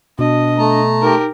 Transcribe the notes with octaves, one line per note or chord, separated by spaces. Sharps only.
B2 D4 D#5
A3 A5 A#5
D#4 G4 A#4